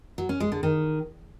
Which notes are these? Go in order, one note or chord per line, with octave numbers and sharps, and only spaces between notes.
F#3
C#4
G#3
D3
D#3